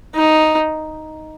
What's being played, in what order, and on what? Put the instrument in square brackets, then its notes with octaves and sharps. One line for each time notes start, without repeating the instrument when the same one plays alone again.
[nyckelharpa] D#4